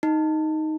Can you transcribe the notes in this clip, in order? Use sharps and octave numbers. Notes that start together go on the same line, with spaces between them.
D#4